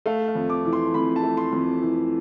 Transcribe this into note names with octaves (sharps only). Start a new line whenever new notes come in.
A3 F5
F5
F2
D6
E3
C6
F2 B5
A5
A3
C6
F2
E3